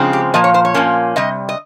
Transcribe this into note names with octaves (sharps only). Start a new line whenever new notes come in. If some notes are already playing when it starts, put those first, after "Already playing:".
Already playing: C#3 F3 G#3 C4
G4
A#2 F3 A#3 D#5
C#5
C5
C#5
A#2 F3 A#3 C#4
C3 G3 D#5
D#5